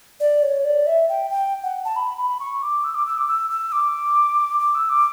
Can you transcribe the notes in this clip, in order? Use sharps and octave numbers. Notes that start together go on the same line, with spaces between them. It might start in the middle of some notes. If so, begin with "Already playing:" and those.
D5
C#5
D5
E5
G5
G5
F#5
A5
B5
B5
C#6
D6
E6
D6
E6
D6
E6
E6
D6
D6
E6
D6